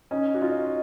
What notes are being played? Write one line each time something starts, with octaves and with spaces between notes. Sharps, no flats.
C#4 D#4
F#4
D#4 F4